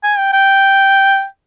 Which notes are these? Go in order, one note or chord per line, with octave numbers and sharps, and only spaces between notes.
G#5
G5
G5